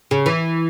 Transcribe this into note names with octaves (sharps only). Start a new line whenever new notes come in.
C#3
E3